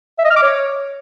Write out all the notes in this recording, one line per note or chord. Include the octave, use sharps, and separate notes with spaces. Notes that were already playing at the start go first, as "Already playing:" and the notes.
E5
D#5
F6
D6
C#5